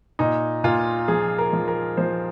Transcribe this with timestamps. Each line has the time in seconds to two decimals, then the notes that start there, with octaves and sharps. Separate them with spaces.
0.19 A#2 D#4
0.64 A#2 F4
1.08 F3 G#4
1.38 A#4
1.53 F3
1.68 A#4
1.97 F3 C5